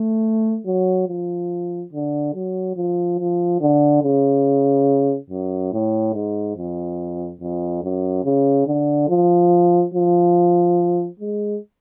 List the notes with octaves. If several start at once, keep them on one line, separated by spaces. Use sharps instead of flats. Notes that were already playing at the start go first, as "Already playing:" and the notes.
Already playing: A3
F#3
F3
D3
F#3
F3
F3
D3
C#3
F#2
A2
G#2
F2
F2
F#2
C#3
D3
F3
F3
G#3